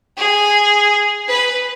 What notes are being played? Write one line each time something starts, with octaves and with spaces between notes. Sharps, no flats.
G#4
B4